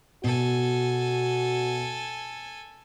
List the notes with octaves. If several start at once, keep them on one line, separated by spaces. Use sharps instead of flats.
B2 F#4 A4 G#5